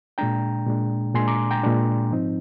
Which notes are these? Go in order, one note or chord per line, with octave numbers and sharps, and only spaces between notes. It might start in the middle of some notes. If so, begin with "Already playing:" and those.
A#2 G#3 D4 G5 A#5
A#2 G#3 D4
A#2 G#3 D4 G#5 C6
A#5 D6
G5 A#5
A#2 G#3 D4
G#2 F3 C4 D#4